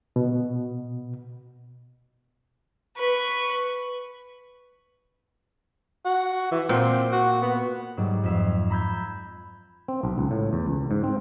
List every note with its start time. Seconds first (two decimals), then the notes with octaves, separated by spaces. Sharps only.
0.16 B2
2.97 B4 C#6
6.05 F#4
6.52 E3
6.69 A#2 C4
7.12 F#4
7.42 B3
7.97 G#2 F#3 G3
8.23 F2 E5 F5
8.70 A#5 B5 E6 G6 G#6
9.88 C4
10.03 B1
10.18 C#2
10.31 A2
10.53 E2
10.66 C#2
10.91 G#2
11.04 C4